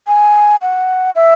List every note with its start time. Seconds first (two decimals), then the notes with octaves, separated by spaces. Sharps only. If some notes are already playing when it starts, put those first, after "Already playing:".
0.07 G#5
0.62 F#5
1.15 E5